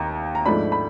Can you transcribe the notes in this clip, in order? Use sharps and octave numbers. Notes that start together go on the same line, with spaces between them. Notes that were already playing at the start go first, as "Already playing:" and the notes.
Already playing: D#2 A#5
A#5
G#2 F3 A3 D4 B5
B5